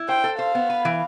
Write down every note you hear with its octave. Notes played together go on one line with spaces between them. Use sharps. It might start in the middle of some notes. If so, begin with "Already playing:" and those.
Already playing: E4
C5 G5
A4
C5 F5
B3
B4
E3